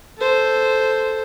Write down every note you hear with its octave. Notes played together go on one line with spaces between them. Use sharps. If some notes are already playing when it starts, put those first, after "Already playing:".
A4 C5